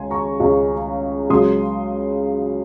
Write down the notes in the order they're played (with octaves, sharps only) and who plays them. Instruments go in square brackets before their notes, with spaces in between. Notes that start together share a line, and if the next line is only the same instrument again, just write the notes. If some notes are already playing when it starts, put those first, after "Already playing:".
Already playing: [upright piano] C#2 C#3 G#3 G#5 C6
A#5 C#6
C#2 C#3 G#3
C#2 C#3 F#3 C6 D#6